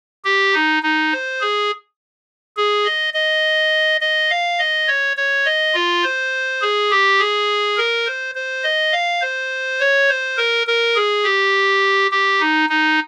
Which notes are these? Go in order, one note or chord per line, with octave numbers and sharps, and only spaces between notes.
G4
D#4
D#4
C5
G#4
G#4
D#5
D#5
D#5
F5
D#5
C#5
C#5
D#5
F4
C5
G#4
G4
G#4
A#4
C5
C5
D#5
F5
C5
C#5
C5
A#4
A#4
G#4
G4
G4
D#4
D#4